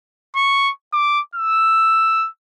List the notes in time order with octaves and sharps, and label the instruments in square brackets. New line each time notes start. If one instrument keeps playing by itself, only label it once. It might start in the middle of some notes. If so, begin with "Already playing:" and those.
[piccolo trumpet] C#6
D6
E6